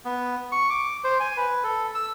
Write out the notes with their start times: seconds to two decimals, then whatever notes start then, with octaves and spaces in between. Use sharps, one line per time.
0.05 B3
0.52 C#6
0.70 D6
1.04 C5
1.20 G#5
1.37 B4
1.64 A4
1.95 E6